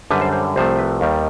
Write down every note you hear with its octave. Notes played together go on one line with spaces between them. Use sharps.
F#2 D3 G3 B4
C5
C5
C2 C3 F3 A3 C5
B4
D#2 D#3 G3